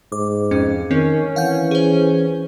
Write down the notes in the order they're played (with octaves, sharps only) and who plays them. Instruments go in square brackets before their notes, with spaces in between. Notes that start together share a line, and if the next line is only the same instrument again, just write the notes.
[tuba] G#2 [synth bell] D6
[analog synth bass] F2 [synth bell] C#4
[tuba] D#3 [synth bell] C4 [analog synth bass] C#4
[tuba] E3 [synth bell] F5 F#5 G6
[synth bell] G#4 C5